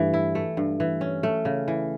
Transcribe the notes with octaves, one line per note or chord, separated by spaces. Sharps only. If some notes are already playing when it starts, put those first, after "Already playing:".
Already playing: G2 E3 A3
E4
A3
G2
E3
C#4
A3
C#3
E3